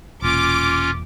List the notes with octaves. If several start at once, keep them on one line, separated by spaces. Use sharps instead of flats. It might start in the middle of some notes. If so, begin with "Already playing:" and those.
E1 A#2 C#4 F4 D6